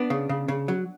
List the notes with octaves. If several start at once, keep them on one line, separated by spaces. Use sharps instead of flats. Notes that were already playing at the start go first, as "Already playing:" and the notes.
Already playing: B3 D4
C#3
C#3
C#3
F#3